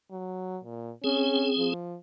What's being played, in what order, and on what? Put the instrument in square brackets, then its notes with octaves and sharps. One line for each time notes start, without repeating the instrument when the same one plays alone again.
[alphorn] F#3
A#2
[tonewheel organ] C4 G#4 [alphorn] C#4
[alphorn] F3